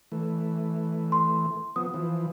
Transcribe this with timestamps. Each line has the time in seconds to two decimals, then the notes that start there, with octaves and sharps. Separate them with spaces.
0.12 E3 A3
1.12 C6
1.76 F3 B3 D#6
1.94 E3 F3